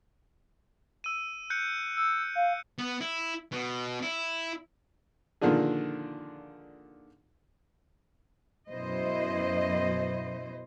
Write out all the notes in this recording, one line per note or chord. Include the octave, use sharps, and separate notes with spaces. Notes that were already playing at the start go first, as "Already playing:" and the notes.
E6 D#7
F#6 G6 C#7
E6
F5
B3
E4
B2
E4
A#2 D3 D#3 F3 D4 G#4
F#2 B2 E4 C5 D#5